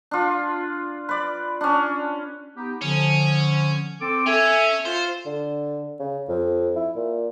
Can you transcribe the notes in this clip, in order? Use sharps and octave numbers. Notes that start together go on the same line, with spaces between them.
D4 F4
B4 D5
C#4 D4
B3 D#4 G4
D3 F3 C#4
C4 A4 D6
C#4 A4 E5 G#5
F4 C5
D3
C#3
F2
E4
A#2